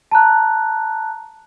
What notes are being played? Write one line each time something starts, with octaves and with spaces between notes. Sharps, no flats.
A5 A#5 F#6